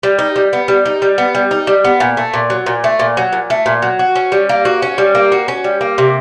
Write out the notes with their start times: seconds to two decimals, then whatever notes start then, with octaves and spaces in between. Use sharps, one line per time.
0.03 G3
0.19 D#4
0.36 G3
0.53 B3
0.68 G3
0.86 D#4
1.02 G3
1.18 B3
1.35 G3
1.51 D#4
1.67 G3
1.84 B3
2.00 A#2
2.17 A3
2.34 A#2
2.50 F#3
2.66 A#2
2.84 A3
2.99 A#2
3.17 F#3
3.33 A#2
3.50 A3
3.66 A#2
3.82 F#3
3.99 F#4
4.16 C#4
4.32 G3
4.49 A#3
4.65 F#4
4.82 C#4
4.98 G3
5.15 A#3
5.32 F#4
5.48 C#4
5.64 G3
5.81 A#3
5.98 C3